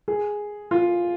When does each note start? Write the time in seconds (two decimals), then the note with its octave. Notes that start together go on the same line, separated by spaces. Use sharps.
0.08 G#4
0.71 F4